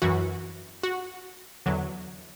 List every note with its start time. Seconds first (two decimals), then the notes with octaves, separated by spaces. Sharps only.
0.02 F#2 E3 F#4
0.83 F#4
1.66 E2 D3 F#3